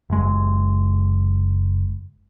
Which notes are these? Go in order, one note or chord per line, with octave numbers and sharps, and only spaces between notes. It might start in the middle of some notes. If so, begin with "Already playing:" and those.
F#1 G#3